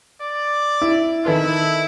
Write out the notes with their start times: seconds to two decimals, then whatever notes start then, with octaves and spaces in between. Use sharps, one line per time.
0.22 D5
0.82 E4
1.26 D#3 E4 A4 B4